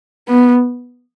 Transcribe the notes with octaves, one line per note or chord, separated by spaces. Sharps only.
B3